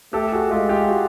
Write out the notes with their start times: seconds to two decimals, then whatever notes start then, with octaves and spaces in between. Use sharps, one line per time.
0.13 A3 G4 A4
0.33 F#4 G#4
0.51 G#3 F4 G4
0.69 F4 G4
0.88 F#4 G#4